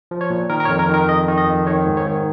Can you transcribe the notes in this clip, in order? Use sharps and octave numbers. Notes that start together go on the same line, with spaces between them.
F3
C#5
A#2
D#3 A#4
A#4
C#5
F2
A#4
D#3
A#4
F2 D#5
D#3
D#5
F2
D#3 C#5
G#2
C#5
D#3